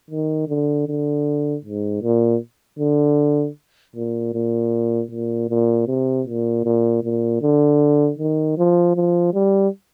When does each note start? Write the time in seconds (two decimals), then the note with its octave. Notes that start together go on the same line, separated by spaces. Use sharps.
0.10 D#3
0.48 D3
0.87 D3
1.65 G#2
2.02 A#2
2.79 D3
3.96 A#2
4.34 A#2
5.11 A#2
5.49 A#2
5.87 C3
6.27 A#2
6.64 A#2
7.03 A#2
7.41 D3
8.18 D#3
8.57 F3
8.96 F3
9.33 G3